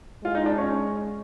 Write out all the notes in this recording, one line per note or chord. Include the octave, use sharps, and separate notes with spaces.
G#3 F4
D#4
D4
C#4